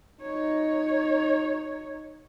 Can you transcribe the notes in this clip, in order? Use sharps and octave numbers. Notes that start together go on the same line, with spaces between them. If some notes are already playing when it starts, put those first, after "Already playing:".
D#4 C#5